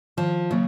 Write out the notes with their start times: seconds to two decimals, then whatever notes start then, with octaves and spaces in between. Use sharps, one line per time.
0.17 D#3 F3
0.50 C#3 F#3 A#3